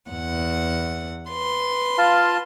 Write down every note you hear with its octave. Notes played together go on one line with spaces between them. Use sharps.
E2 F#5
B4 C6
F4 F5 A5